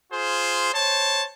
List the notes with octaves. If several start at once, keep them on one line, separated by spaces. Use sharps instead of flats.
F4 G#4 C5
C5 C#5 A5